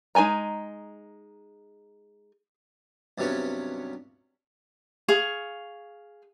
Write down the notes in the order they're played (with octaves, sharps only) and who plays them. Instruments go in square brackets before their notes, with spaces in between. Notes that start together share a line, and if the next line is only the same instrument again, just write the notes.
[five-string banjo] G#3 D#4 A4 G#5 A#5
[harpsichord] G2 C3 F#3 B3 C#4
[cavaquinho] G#4 F5 C#6